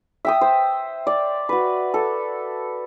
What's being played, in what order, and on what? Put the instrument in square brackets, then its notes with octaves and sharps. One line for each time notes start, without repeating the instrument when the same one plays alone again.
[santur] E5 G5 D#6
C5
D5
F#4 B4
A4